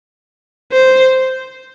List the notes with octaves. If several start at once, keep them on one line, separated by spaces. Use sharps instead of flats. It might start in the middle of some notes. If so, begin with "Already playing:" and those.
C5